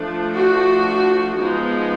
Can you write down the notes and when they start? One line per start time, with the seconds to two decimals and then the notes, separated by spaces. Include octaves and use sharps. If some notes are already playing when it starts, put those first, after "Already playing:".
Already playing: F3 A3 D4
0.35 F#4
1.37 F3 G#3 B3 D#4